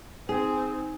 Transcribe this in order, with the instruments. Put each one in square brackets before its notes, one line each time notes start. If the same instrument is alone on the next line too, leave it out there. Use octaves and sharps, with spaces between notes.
[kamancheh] C4 [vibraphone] D#4 [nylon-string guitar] G#4 [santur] G#5